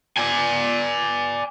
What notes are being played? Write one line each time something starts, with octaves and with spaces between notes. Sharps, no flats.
D5 G#5